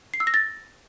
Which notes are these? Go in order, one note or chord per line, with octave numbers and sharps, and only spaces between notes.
C7
E6
A#6
A6